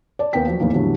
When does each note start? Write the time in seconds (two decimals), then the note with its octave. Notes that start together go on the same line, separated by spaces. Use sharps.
0.19 D5 A5
0.33 D#2 B3 A#4 B4 G5 B6
0.48 F3 F#3
0.60 E2 A2 D#3 A#3
0.73 E2 A2 D3 F#3 G3